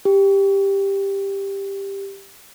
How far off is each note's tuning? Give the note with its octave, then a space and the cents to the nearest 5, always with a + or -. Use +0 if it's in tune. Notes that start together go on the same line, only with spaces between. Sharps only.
G4 +5